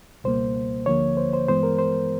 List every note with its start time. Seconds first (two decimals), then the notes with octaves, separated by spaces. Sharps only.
0.24 C#2 B2 G3 A#3 C5
0.86 D2 D3 F3 A#3 C#5
1.17 C5
1.33 C5
1.48 G2 E3 G#3 B3 C5
1.63 A#4
1.79 C5